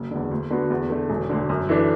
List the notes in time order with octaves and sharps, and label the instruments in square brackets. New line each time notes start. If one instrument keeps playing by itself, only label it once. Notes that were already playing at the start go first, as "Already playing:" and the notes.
Already playing: [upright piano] F#1
E2 D3
D2
D3 B3 F#4
E2
D3 A3
E1
D2 D3
F#2
E3 A3 D4